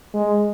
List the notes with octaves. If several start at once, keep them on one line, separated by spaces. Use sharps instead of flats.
G#3